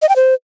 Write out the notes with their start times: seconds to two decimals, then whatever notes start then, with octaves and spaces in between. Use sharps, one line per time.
0.02 D#5
0.09 G5
0.16 C5